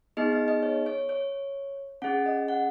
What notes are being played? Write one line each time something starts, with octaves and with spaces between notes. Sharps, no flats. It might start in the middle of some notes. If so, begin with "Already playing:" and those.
B3 D#4 G#4 D#5
D#5
D#5
C#5
C#5
C#5
C#4 G#4 F#5
D#5
F#5